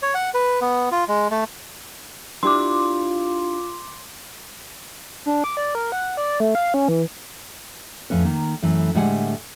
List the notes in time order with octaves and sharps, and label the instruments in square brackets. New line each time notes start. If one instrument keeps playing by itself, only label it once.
[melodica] C#5
F#5
B4
B3
F4
G#3
A3
[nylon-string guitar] D4 E4 G4 [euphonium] F4 [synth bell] C6 D6
[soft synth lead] D4
D6
D5
A#4
F#5
D5
A3
F5
C#4
E3
[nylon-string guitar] F2 A2 C#4 B4 C#5
D#3 A#3
F#2 E3 A3
A2 D3 G3 G#3 F#5 G#5